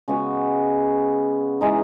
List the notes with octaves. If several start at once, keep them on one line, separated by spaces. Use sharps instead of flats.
C#3 G#3 B3 F#4
E3 G#3 D#4